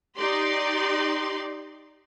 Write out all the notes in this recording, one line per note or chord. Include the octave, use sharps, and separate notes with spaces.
D#4 G4 D5 C6